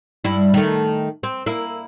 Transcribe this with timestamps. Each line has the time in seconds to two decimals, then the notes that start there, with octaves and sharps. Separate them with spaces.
0.24 G2 E4
0.54 D#3 A3
1.23 C4
1.46 A#3 E4